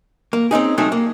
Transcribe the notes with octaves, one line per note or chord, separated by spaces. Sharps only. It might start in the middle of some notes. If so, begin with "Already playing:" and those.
A#3
C4 C#4 D#4 G#4
F#3 G#3 A3 C4 D#4 G#4
A#3